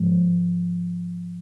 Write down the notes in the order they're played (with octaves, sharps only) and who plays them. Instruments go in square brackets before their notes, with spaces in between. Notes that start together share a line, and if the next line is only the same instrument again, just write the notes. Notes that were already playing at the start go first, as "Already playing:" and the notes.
Already playing: [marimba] G#2 F3 G#3